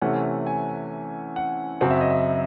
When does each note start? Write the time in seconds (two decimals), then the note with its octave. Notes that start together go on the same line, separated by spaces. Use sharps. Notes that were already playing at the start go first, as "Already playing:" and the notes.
0.01 C3 E3 A3 C#4 F#5
0.47 G#5
1.36 F#5
1.81 F#2 C#3 F#3 C4 F#5
1.91 E5
2.01 D#5
2.10 E5